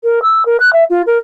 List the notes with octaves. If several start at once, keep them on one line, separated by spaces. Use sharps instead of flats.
A#4
E6
A#4
F#6
E5
F4
A#4